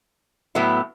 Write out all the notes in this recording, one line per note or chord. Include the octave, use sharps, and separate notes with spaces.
A2 F#3 B3 E4